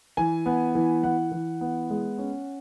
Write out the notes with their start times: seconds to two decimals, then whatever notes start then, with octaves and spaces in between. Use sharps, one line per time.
0.17 E3 G#5
0.46 B3
0.75 E3
1.03 E3 F#5
1.32 E3
1.61 B3
1.90 G#3
2.18 C#4